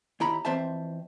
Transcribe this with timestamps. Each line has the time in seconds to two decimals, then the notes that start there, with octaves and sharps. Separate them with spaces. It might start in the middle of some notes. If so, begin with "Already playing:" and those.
0.20 D#2 E4 A#5 B5
0.45 F2 E3 C4 C5 E5 A5